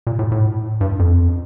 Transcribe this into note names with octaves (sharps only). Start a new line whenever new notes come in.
A#2
A2
A2
G2
F2